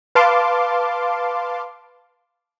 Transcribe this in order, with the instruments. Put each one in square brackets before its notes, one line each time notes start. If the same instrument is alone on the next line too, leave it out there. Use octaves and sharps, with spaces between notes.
[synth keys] B4 F5 A5 C6 D6